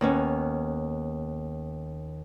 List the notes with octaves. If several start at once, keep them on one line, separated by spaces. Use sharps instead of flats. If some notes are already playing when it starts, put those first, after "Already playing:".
D#2 B3 C#4